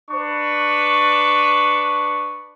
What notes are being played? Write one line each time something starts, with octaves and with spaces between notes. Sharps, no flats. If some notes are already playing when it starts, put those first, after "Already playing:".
D4 B4 C#6